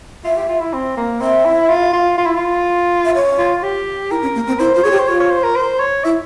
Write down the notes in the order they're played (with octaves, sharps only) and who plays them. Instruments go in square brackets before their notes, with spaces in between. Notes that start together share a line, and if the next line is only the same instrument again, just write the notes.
[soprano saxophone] F4 [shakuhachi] E5
[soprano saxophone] G4
F4
E4
C4
A#3
[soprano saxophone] C4 [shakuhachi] E5
[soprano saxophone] E4
F4
F4
F4
E4
F4
[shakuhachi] E5
C#5
[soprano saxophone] F4
G4
[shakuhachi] E4 [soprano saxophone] A#4
[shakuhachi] C#4
A#3
C4
[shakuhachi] E4 [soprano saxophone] C5
[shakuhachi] F4 [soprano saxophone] C5
[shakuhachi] G#4 [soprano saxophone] C#5
[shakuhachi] G4
[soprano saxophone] C5
[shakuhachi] F4 [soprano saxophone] C#5
[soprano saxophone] C#5
C5
A#4
C5
C#5
[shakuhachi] E4 [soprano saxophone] E5